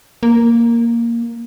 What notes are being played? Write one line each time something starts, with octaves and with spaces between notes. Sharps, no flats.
A#3